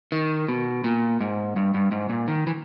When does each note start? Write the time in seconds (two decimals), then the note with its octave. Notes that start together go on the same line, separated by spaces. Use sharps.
0.12 D#3
0.48 B2
0.84 A#2
1.20 G#2
1.56 G2
1.74 G2
1.91 G#2
2.09 A#2
2.28 D#3
2.47 E3